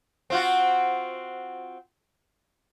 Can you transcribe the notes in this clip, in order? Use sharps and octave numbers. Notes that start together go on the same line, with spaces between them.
C4 F4 F#4